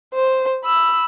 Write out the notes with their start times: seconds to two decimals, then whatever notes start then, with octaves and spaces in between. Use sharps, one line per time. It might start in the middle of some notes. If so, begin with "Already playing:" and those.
0.14 C5
0.65 B5 E6